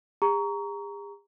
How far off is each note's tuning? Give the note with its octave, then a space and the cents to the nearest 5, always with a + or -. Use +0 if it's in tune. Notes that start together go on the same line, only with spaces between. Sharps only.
G#4 -45 A#5 +0 C#6 +30